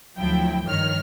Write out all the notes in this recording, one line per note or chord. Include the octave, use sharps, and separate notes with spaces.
D2 F3 F#3 E4 G5
G2 D#3 F3 C#5 F6